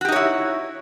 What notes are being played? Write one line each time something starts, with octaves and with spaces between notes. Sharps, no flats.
D#4 E4 F#4 G4 C#5